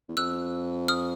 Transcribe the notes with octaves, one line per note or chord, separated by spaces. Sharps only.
E2
F2 E6 F#6
D#6 F6